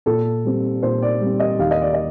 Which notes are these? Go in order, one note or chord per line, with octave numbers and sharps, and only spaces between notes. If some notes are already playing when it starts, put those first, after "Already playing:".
A#2 A4
G3 C4
A#2 C5
D5
G3 C4
D#5
D#2 F5
D#5
D5
D#5